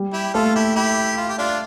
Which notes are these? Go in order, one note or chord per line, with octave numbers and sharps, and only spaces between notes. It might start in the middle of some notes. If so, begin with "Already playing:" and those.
Already playing: G3
E4 G4
A3 F4 A4
E4 G4
E4 G4
F4
G4
D4 F4